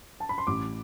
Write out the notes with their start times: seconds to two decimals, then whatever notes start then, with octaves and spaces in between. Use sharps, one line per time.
0.20 A5
0.29 B5
0.38 C6
0.47 A1 D6